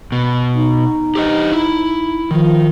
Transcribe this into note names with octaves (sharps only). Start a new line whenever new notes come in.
B2
D#4
G4 C5 D#5
E4
D#3 F3